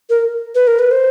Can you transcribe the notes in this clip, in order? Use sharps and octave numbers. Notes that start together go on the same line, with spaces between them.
A#4
B4
A#4
B4
C5